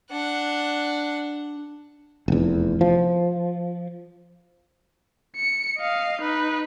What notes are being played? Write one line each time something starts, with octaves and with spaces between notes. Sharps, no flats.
D4 F#5
F1 E2
F3
C#7
D#5 F5
D#4 B4